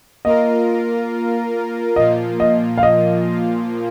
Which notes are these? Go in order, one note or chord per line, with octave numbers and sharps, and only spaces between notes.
A#3 F4 A#4 D#5
A#2 F3 A#3 F4 D#5
D#5
F5
D#5